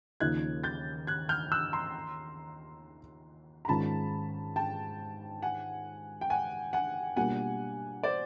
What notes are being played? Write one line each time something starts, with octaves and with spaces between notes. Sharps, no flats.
D#2 C#3 F3 A#3 D#4 F#6 G#6
G6 A6
F#6 G#6
F6 G6
E6 F#6
A#5 C6
A#5
G#2 D#3 G#3 C#4 F4 A5 B5
G5 A5
F#5 G#5
G5
F#5 G#5
F#5 G#5
B2 G3 A#3 D4 F4 F#5 G#5
C5 D5